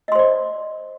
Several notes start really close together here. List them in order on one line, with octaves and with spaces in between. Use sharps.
D#5 C6 C5 D5